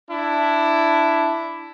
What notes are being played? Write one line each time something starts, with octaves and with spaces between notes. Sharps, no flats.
D4 E4